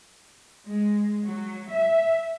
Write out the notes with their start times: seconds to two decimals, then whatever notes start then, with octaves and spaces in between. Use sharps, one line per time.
0.67 G#3
1.26 F#3
1.70 E5